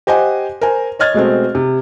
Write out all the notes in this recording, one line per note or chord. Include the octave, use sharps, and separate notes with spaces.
G4 C5 D#5 F#5 G#5
A#4 C5 G#5
C#5 D#5 F6 G#6 A6
B2 G#3 A3 C4
C3